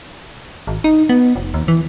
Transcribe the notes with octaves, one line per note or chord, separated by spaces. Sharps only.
G#1
D#4
B3
F1
D#2
E3